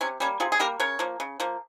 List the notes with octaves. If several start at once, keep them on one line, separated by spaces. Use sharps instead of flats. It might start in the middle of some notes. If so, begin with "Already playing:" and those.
C3 C#4
G3 A#3 C#4
C3 F4 G#4
G#4
G3 A#3 G4 A#4
C#3 A#4 C#5
F3 A#3
C#3
F3 A#3